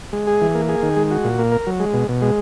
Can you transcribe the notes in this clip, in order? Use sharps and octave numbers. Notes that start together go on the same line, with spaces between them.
G#3
G#4
E3
A#3
G#4
D#3
G#3
F#4
A#2
A#3
A#4
F#3
G#3
B2
B2
G#3